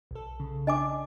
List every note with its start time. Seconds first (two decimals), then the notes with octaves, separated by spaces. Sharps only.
0.11 B1 A4
0.40 C#3
0.67 D4 D#5 G#5 D6